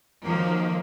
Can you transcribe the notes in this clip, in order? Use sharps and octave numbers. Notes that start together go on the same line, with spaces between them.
D#3 F3 F#3 A#3